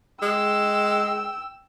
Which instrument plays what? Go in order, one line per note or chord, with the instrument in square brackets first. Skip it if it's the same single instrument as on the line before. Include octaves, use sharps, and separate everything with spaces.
[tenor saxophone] G#3 [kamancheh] G5 E6